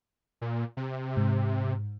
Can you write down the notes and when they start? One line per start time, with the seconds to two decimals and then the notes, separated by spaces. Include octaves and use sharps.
0.41 A#2
0.77 C3
1.17 G#2